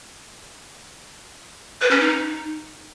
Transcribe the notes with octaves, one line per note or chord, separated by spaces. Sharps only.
B4
C#4
D#4